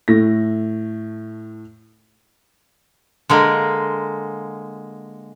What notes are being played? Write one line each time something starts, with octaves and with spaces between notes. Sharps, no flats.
A2 A3 A#6
D3 G#3 A#3